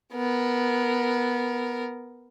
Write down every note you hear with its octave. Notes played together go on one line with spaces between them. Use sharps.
B3 A#4